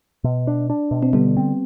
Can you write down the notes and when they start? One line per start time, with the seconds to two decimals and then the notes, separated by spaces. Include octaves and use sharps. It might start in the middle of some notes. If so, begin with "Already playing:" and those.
0.24 B2
0.47 D4
0.70 D4
0.91 B2
1.03 C4
1.13 D3 G3 B3
1.37 C4